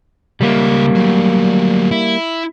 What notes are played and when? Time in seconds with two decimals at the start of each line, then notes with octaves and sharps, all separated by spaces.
0.41 C#2 G3 A#3 E5
0.96 F#3 A3
1.91 E4